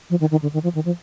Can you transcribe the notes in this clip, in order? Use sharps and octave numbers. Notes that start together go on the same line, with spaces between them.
F3
D#3
D#3
D3
D#3
F3
D#3
F3